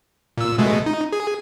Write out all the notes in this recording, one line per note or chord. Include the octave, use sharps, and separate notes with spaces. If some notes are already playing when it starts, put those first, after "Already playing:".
A#2 E6
B2 G#3 A3
D#4
G#4